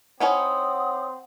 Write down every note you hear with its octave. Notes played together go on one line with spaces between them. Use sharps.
C4 C#4 D#4 E4 F#5 D#6